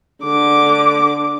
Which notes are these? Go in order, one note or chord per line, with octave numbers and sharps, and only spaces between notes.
D3 D6